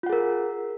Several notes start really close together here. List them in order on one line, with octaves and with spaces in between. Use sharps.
F4 F#5 G#4 A#4